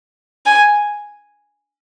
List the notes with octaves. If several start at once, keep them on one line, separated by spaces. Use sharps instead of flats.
G#5